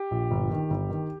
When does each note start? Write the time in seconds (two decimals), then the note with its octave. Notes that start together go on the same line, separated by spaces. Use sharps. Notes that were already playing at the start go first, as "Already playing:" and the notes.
Already playing: G4
0.11 A#1
0.31 G1
0.51 D#3
0.70 G1
0.90 D#3